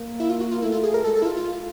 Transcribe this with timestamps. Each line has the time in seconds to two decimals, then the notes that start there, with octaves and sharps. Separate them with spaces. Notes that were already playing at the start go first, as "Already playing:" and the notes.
Already playing: A#3
0.20 E4
0.30 F4
0.40 F#4
0.51 F4
0.62 A3 E4
0.72 F4
0.84 G#4
0.94 A#4
1.04 G#3 A4
1.15 A4
1.22 E4
1.26 F4
1.37 F4